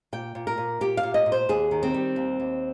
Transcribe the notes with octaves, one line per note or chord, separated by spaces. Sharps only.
A#2 G5
A#2
A#4
A#2
A#2 G4
F5
A#2
D#5
A#2
C5
D#2 G#4
D#3
C4
G3
D#2
D#2